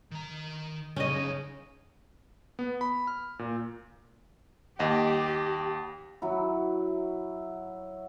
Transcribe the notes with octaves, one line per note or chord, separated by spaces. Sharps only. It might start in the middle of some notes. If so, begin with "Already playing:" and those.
D#3 A#5
F#2 C#3 C#4 D#4 D#5
B3
B5
F6
A#2
D#2 G4 D#5 F#5
F#3 E4